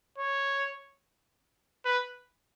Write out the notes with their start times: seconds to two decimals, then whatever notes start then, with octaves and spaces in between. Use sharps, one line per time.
0.18 C#5
1.85 B4